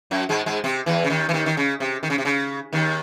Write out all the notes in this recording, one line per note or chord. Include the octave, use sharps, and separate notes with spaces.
F#2 F#3
G#2 G#3
G#2 G#3
C3 C4
E2 E3
C#3
D#2 D#3
E3
D#2 D#3
D#3
C#3
C3
D#3
C#3
C3
C#3
D#2 D#3